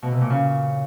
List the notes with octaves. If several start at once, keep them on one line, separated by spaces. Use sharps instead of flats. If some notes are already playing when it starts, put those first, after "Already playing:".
B2
C3
A#2
C#3